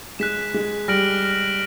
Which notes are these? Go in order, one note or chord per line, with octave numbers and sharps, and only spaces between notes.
G#3 F#6 B6 E7
G#3
G3 F6 A#6 D7 F#7